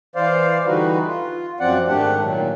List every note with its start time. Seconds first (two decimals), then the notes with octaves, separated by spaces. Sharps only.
0.16 E3 C5 D5 F5
0.66 D3 E3 G3 D#4 F#4 B4
1.06 F4
1.60 F#2 F3 C4 D5 F#5
1.88 G#2 D#3 A3 D4 G4 F#5
2.21 A#2 D#3 F#3